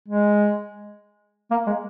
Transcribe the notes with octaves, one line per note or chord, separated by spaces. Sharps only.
G#3
A#3
G#3